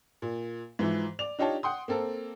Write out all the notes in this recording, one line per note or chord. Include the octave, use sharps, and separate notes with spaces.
A#2
G#2 E3 F3 E4
D5 F7
D4 D#4 F4 G4 C#5 A5
F#5 G5 C6 D#6
A#3 C4 A4 A#4